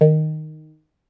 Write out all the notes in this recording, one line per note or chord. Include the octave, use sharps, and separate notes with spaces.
D#3